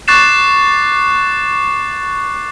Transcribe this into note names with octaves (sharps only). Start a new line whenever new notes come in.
C#6 D6 F#6 A6 C7 E7